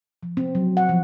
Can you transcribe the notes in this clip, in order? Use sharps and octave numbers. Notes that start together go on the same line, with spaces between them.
F3
C4
F#3
F#5
F3